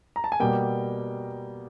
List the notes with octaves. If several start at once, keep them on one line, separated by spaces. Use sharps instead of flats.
A#5
A5
G#5
B2 G3 A#3 G5